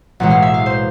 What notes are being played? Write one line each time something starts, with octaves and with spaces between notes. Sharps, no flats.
B1 A2 E3 G#3 F#5
F5
E5
F5
C5